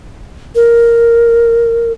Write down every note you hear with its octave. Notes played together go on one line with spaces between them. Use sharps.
A#4